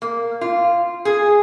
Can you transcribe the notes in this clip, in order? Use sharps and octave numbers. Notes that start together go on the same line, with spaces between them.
A#3
F4
G#4